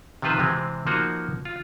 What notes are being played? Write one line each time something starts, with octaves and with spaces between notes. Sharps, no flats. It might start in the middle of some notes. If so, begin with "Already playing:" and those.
C3 D#3 F3 F4 B4 C5
C3 E3 G#3 C4
F3 A#3 D#4 F#4
F4